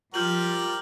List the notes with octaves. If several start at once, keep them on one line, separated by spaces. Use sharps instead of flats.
F3 G3 F4 G4 A#4 F6 G6 F#7